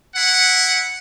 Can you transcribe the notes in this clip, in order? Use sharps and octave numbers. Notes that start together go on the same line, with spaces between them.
E4 F#5